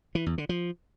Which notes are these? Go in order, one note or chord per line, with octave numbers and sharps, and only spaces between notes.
E3
E2
D3
F3